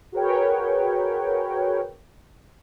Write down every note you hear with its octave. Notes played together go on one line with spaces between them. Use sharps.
F#4 G#4 A#4 B4 C#5 G5